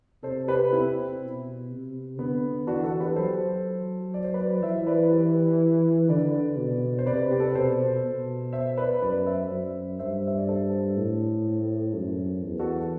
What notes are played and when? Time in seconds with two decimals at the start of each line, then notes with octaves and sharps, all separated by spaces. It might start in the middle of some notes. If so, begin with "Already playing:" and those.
0.23 C3 A4 C5
0.48 G4 B4
0.72 C4 E4
1.21 B2
1.71 C3
2.18 D3 B3
2.67 E3 D4 F#4
2.84 F#4 A4
3.00 G4 B4
3.16 F#3 A4 C5
4.14 D5
4.24 C5
4.34 B4 D5
4.63 E3 C5 E5
4.87 B4 D5
5.11 G4 B4
6.09 D3 B4 D5
6.58 B2
6.99 C5
7.06 C3 B4 D5
7.31 G4
7.40 A4
7.48 B4
7.55 B2 A4 C5
8.04 B2
8.53 C5 E5
8.77 B4 D5
9.02 F#2 B4 D5
9.26 C5 E5
9.51 F#2
9.99 G2 C5 E5
10.27 E5
10.38 D5
10.48 A4 C5
10.97 A2
11.95 F#2
12.43 E2
12.60 F#4 A4